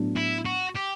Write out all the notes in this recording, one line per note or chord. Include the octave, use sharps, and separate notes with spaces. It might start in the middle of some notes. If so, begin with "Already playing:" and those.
Already playing: A2 F#3 B3 D4
E4
F#4
G4